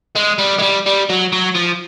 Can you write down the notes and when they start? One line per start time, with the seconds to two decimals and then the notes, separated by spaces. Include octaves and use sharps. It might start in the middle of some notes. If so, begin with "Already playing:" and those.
0.16 G#3
0.39 G3
0.59 G#3
0.62 G3
0.86 G3
1.09 F#3
1.32 F#3
1.55 F3